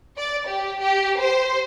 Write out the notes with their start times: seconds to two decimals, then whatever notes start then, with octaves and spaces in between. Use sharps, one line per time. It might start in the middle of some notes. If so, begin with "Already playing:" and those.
0.17 D5
0.48 G4
0.81 G4
1.20 C5